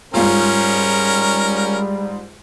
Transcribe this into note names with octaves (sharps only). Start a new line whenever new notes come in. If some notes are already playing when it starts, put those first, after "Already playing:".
G#2 G3 C#4 F4 A#4